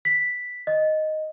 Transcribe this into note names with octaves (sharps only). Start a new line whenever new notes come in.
B6
D#5